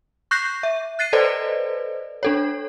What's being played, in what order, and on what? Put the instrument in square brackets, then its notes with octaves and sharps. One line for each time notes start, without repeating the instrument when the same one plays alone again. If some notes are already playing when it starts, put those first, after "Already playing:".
[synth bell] C#6 F#6 G6 A#6 C7
E5
F#6 A6 C7 D#7
A4 B4 C5 D5 D#5
D4 A4 C#5